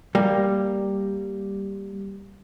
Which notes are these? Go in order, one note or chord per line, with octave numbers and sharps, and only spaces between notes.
G3 A#3